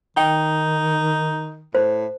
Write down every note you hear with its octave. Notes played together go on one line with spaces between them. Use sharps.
D#3 D#4 G5
A2 C5